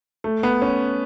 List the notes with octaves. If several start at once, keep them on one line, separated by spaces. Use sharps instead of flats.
A3
B3
C#4